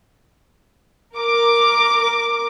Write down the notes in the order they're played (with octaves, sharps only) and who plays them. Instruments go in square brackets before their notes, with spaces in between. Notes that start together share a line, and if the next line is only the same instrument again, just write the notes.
[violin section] A#4 D6